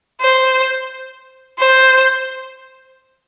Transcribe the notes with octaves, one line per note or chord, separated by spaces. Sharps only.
C5
C5